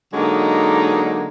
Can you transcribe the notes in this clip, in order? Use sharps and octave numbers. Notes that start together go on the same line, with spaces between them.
D3 F#3 G#3 A#3 D#4